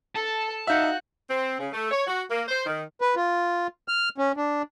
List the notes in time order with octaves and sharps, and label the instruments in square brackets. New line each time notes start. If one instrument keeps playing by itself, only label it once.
[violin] A4 [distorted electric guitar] A5
[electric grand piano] D#4 E5 [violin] F#4 F#6 [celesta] F5 G6 C#7
[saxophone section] C4
C#3
A3
C#5
F#4
A#3
C5
D#3
[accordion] B4
F4
F6
C#4
D4